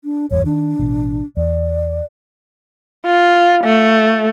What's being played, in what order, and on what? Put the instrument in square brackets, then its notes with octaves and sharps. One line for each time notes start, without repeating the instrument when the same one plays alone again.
[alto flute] D4
[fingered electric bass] G#1 E2 G2 [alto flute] C#5
[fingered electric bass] D#3 [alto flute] D4
[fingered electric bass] A1 B2
[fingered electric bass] E2 [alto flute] D5
[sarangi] F4
A3